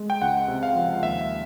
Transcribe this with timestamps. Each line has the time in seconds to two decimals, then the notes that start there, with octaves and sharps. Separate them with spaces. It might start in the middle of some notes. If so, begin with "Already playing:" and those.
Already playing: G#3
0.10 G5
0.21 C#2 F#5
0.48 C3
0.63 F5
0.75 F3
1.03 D#2 E5